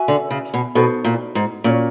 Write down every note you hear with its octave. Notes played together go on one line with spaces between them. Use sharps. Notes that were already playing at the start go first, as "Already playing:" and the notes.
Already playing: F#4 B4 E5 G#5
D3
C#3
B2
B2 D#4 F#4 A4 C5
A#2
G#2
A#2 C#4 F#4 A#4 C#5